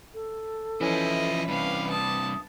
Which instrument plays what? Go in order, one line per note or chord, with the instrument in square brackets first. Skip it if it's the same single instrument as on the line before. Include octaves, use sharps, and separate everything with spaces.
[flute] A4
[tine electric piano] E3 C#4 [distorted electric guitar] F3 E4 [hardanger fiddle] D#5 E5
[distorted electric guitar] G2 C3 [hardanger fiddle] B4 F5
[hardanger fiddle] A5 [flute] D#6